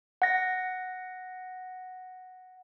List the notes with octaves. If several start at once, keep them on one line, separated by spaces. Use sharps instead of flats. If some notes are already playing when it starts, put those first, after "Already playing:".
F#5 A#6